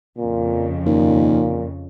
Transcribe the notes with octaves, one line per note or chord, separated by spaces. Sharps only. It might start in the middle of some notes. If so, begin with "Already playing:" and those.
F2 A#2 C#3
D#2 A#2